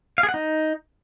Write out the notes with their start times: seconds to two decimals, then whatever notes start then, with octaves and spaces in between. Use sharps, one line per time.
0.18 F5
0.23 G#4
0.29 F#5
0.34 D#4